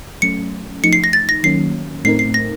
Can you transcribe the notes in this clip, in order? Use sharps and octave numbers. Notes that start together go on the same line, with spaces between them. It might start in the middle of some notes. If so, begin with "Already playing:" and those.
F#3 A3 C#4 C#7
F3 A3 D#4 C#7
C7
A#6
A6
A#6
D#3 F#3 A#3 C#4 C7
A2 A3 C4 D#4 A#4 C7
C7
A#6